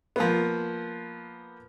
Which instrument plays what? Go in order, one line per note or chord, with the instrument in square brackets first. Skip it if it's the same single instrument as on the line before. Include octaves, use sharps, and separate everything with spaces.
[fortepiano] F3 A#3 B3